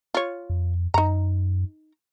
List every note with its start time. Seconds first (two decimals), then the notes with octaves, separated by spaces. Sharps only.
0.14 F4 C#5
0.50 F2
0.94 F#2 D#4 A#5